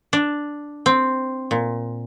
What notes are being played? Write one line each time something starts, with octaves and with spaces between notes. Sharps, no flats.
D4
C4
A#2